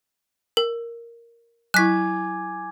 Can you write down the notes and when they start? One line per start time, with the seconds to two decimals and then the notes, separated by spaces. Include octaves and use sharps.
0.57 A#4
1.74 F#3 E4 G#5 D6 F#6 G#6 B6